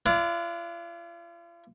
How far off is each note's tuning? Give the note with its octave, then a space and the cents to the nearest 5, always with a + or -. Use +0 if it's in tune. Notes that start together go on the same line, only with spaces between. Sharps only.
F4 -40 D5 +0 F#5 -35